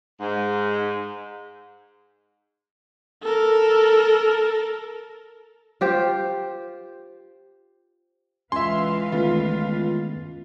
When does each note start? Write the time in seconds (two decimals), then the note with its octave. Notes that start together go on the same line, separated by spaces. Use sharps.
0.20 G#2
3.23 A4 A#4
5.81 F4 G4 C5
8.52 C#2 E3 B4 E5 F5 G#5 C6
9.12 C#2 D#3 A3 B3 F4